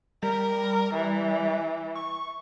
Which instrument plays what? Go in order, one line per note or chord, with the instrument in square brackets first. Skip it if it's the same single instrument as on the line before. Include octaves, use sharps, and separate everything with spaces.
[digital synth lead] G3 [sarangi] A#4
[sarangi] E3
[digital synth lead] C#6